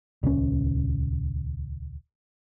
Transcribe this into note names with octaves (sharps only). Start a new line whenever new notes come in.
D#1 C#2 C#4